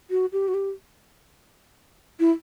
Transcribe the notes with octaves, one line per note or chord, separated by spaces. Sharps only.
F#4
G4
F#4
G4
E4